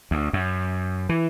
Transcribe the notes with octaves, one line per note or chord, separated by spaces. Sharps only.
D2
F#2
E3